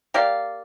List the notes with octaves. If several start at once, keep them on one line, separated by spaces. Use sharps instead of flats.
A#3 G4 D5 F5